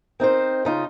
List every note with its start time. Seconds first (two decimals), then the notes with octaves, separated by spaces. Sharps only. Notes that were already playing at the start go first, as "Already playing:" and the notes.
0.20 C4 D#4 A#4 C5
0.65 C#3 D#4 F4